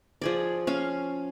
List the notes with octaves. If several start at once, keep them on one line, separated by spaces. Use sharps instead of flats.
F3 G#4 D5
C#4 F5